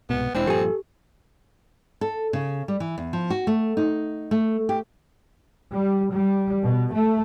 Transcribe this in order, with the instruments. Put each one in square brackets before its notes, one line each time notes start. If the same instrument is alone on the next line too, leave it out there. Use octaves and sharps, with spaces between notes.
[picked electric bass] C2 G#2 B2 [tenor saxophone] B3
[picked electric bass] E1 [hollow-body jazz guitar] G#3 D4 E4 [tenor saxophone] C4 [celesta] C5
[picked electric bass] G2 A#2 F3 [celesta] G4 [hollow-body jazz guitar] A4 G#5
[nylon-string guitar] A4
C#3
G3
E3
E2
F3
F#4
A3
D#4
A3
G4
[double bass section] G3
G3
B2
A3